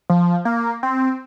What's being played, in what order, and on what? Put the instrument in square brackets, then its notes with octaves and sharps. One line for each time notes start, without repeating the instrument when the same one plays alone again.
[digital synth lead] F3
A#3
C4